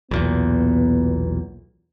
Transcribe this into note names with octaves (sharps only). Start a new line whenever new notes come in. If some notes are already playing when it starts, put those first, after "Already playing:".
B1 E2 A#2 B3